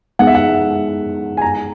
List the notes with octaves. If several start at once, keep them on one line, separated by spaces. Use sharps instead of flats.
G#3 B3 D#4 G#4 F#5
E5
F#5
G#5
A#5